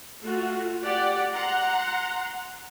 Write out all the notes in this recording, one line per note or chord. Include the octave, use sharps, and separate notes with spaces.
A3 F4 F#4
G4 D5 F#5
F#5 A#5 C6